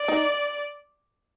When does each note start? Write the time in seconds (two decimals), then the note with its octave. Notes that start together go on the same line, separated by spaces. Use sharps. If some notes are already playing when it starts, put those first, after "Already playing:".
Already playing: D5
0.08 D#4